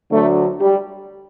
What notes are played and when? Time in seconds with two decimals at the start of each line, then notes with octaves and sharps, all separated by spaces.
0.12 D2 D3 F#3 A3
0.60 G3